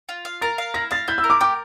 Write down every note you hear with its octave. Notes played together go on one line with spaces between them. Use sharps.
F4
F5
A#4 A6
F5
E4 A#6
F5 A6
E4 G6
E6
A#4
D6
G4 D6